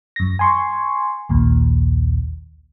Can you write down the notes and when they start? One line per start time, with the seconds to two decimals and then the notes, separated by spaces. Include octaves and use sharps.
0.16 F#2 A#6
0.39 G#5 C6 C#6
1.29 A#1 D#2 A#2